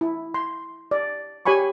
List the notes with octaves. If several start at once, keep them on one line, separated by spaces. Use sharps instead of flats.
E4
C6
D5
G4 C#5 G#5 B5 C#6